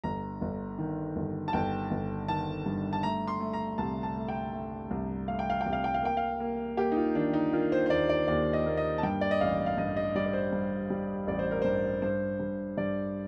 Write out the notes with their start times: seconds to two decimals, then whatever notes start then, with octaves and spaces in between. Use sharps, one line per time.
0.04 G1 A#5
0.41 G1
0.78 D#3
1.16 G1
1.48 A5
1.53 G1 G5
1.91 G1
2.28 D#3 A5
2.66 G2
2.93 A5
3.03 A3 A#5
3.28 C6
3.40 A3
3.53 A#5
3.78 C2 A5
4.03 A5
4.16 A3
4.28 G5
4.53 A3
4.91 C2
5.28 A3 F5
5.39 G5
5.50 F5
5.61 G5
5.66 C2
5.73 F5
5.84 G5
5.94 F5
6.03 A#3 G5
6.17 F5
6.40 A#3
6.77 A#3 G4
6.92 D#4
6.97 F4
7.15 D#3 D4
7.33 D#4
7.53 A#3 F4
7.72 C5
7.86 C5
7.90 D#2 D5
8.09 D5
8.28 D#2 D5
8.53 D#5
8.66 A#3
8.77 D#5
8.98 A5
9.03 G2 G5
9.21 D5
9.31 D#5
9.41 A1 F5
9.66 F5
9.77 G2 D#5
9.97 D#5
10.15 G3 D5
10.26 D5
10.33 C5
10.52 G2
10.90 G3
11.27 A1 D5
11.39 C5
11.51 A#4
11.62 G2 C5
12.02 G2 C5
12.40 G2
12.77 G2 D5